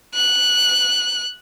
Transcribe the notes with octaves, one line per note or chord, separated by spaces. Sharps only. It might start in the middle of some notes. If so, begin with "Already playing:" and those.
F#6